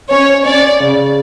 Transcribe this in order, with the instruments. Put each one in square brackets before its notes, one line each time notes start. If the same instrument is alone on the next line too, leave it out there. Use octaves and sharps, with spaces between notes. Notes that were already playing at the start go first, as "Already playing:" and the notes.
[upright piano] C#4 [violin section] C#5
[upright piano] C#4 [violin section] D5
[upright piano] C#3